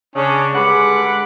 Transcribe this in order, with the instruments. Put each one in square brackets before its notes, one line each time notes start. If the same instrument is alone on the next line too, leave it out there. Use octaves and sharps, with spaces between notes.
[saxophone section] C#3 [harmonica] C#4 D4
[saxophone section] G2 D3 F#5 [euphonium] G#3 [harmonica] B5 D6